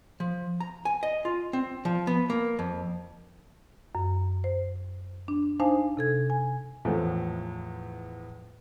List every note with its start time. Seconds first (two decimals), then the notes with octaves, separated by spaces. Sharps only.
0.20 F3
0.60 A#5
0.85 G#5
1.03 D#5
1.25 F4
1.53 C4
1.85 F3
2.07 B3
2.30 A#3
2.59 F2
3.95 F#2
4.44 C5
5.28 D4
5.60 D4 D#4 C5 F5 G#5 A5
5.97 C3 A4 G#6
6.30 G#5
6.85 E2 A2 F3 A3